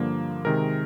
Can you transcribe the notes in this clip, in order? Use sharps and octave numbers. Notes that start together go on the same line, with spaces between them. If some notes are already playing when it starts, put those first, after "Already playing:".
Already playing: G2 D3 F3 A#3
C3 D#3 G#3 A#4